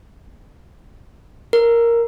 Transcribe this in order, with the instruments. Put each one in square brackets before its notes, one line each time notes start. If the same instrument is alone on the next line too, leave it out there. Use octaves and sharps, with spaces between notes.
[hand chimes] A#4